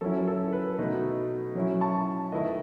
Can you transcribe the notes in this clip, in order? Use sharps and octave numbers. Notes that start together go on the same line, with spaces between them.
F#3 C#4 E4 A4
A4
B4
B2 A3 D#4
F#3 C#4 E4
A5 C#6
D#3 A3 E4 B4 D#5